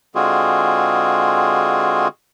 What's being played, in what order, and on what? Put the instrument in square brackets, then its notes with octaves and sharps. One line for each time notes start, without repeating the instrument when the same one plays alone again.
[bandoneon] D3 G#3 C4 F4 F#4 G#4